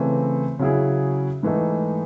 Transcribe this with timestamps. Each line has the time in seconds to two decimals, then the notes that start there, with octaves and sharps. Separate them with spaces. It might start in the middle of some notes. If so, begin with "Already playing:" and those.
Already playing: C#3 E3 A3 C4
0.59 C#3 F#3 C#4 E4 G#4
1.43 G#2 E3 A3 D#4